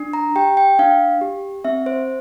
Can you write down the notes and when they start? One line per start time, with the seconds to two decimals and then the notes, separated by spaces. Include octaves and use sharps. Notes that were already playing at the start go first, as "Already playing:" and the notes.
Already playing: D4
0.13 A#5
0.36 G4 G5
0.57 G5
0.79 D4 F5
1.21 G4
1.64 C4 E5
1.86 C5